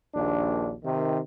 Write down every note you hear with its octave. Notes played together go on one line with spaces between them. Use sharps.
A#1 D#2 D4
C3 D#3